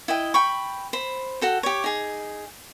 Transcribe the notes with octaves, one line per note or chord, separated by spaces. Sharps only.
E4 D#5 G5
G5 B5 C#6
C5 B5
F#4 A4 G5
G4 C#5
D#4 G#4